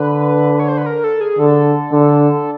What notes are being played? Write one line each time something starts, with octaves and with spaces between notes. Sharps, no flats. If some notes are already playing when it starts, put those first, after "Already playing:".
Already playing: D3 B4
C#5
C5
B4
A#4
A4
G#4
D3 A4
D3